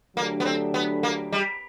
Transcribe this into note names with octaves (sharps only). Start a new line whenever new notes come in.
D3 F#3 A3 A#3 D4 G4
B3
C4
B3
A#3
G3